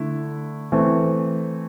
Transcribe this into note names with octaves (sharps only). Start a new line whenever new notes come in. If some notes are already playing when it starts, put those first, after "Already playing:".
Already playing: D3 A3 E4
E3 A3 C4